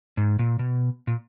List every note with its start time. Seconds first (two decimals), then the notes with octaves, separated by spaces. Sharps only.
0.17 G#2
0.39 A#2
0.59 B2
1.07 A#2